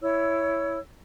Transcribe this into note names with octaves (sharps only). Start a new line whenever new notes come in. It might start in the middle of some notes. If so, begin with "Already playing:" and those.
E4 C#5 E6